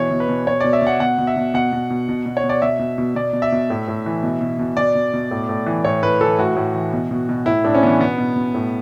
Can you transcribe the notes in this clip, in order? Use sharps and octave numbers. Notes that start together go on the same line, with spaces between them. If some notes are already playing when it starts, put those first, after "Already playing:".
Already playing: B2 E3 C#5
B2
B4
B2
B2 C#5
B2 D5
E5
B2 F#5
B2 F#5
B2
E5
B2
B2 F#5
B2
B2
B2
B2
C#5
B2
D5
B2 E5
B2
B2
B2 D5
B2
E5
B2
A2
A2
E3
B2
B2
B2
B2 D5
B2
B2
A2
A2
E3
A2 C#5
A2 B4
E3 A4
A2 F#4
A2
E3
B2
B2
B2
A2 E4
A2 D4
C#4
E3 B3
B2 B3
B2
B2
A2